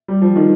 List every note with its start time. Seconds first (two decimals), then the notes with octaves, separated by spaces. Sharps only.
0.08 G3
0.22 F3
0.36 D#3